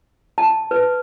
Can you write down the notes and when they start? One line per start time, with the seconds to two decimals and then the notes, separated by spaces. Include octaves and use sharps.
0.38 A5
0.71 B4